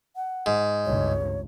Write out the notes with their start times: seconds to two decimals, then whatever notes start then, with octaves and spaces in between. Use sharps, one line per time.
0.16 F#5
0.46 G#2
0.85 G#1 C#2 G2 C#5